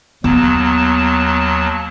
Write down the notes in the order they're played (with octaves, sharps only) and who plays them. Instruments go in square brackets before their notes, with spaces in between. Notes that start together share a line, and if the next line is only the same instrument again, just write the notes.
[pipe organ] D#2 F#3 A5 [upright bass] B3